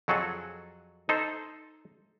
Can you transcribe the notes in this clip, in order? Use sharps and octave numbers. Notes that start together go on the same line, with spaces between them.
F2 F#3 F#4 G#4 A4
D#4 A4 C5